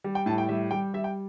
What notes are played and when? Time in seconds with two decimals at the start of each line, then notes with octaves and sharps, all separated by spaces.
0.04 G3
0.15 G5
0.26 A2 A5
0.38 G5
0.49 G3 E5
0.71 G3 G5
0.94 G3 E5
1.04 G5